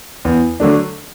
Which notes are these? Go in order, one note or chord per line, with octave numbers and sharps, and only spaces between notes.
E2
D3 F#3 A3 D4